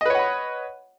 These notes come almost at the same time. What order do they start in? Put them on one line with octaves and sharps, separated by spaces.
D#5 B4 C#5 F#5 B5